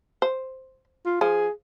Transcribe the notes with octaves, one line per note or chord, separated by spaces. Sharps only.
C5
F4
F3 G#4 C5